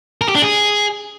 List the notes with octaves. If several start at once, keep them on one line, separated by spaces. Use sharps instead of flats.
A#4
G4
D4
G#4